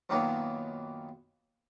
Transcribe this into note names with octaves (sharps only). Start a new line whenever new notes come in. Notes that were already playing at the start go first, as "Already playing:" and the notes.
F#2 A#2 D#3 F#3 A#3 B3